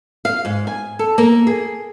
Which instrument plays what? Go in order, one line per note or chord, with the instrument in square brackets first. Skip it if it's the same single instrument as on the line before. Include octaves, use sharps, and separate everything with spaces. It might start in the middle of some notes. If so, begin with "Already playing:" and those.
[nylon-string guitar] F5
G#2
G#5
A4
A#3
G#4